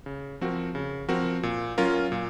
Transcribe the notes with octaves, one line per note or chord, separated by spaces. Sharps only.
C#3
F3 C4 F#4 A#4
C#3
F3 C4 F#4 A#4
A#2
F#3 C#4 F4 A#4
A#2